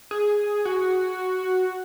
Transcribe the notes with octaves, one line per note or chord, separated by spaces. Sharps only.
G#4
F#4